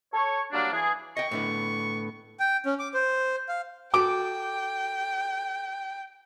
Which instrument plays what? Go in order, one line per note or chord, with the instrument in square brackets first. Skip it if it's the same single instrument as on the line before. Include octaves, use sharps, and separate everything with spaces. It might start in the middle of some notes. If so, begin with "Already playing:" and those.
[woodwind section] A4 C#5
F#3 G3 A#3 D4
E3 G#4
[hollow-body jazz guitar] D#5 G5 [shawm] C#6
[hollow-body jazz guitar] A2 D3 B3
[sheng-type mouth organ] G5
C#4
D6
C5
F5
[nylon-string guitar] F#4 A4 [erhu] G5 [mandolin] D6